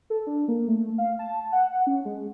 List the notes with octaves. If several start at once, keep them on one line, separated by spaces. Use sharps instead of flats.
A4
D4
A#3
A3
F5
A5
F#5
F#5
C#4
G#3